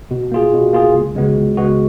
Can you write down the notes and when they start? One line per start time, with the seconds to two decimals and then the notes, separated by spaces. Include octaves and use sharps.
0.11 B2
0.32 A#3 F4 G#4
0.53 B2
0.73 A#3 F4 G#4
0.94 C#2
1.15 C#3 G#3 B3 F#4
1.37 C#2
1.57 C#3 G#3 B3 F#4